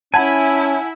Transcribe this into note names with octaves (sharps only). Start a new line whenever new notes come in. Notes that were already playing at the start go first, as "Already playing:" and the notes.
C#4 E4 F#5 G#5 A5 B5 G#6